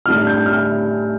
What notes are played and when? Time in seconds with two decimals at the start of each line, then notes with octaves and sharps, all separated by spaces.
0.06 A2 G3 D4 F6
0.27 G6
0.46 F6